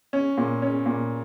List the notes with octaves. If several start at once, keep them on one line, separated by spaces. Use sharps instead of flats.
C#4
A#2
C#4
A#2